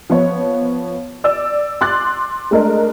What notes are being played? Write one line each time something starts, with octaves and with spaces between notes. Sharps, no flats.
F3 B3 C#5
D5 E6
C6 D6 F#6 A6
G#3 A3 D4 A#4 D#5